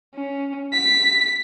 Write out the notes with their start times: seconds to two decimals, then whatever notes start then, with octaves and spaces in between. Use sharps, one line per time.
0.15 C#4
0.73 B6